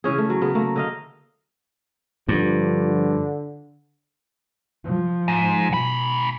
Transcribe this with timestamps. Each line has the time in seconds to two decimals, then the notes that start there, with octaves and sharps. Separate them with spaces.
0.04 C#3 E3 C#4 G#4
0.18 A3
0.30 F#3
0.41 C#3 B3
0.55 A3 A#3
0.76 D3 D#5 F5
2.29 G2 D3 F3
4.84 F3
5.28 G#2
5.74 G#2 B2 B5